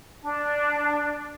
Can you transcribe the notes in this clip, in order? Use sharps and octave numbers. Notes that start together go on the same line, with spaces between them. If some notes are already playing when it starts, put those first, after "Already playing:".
D4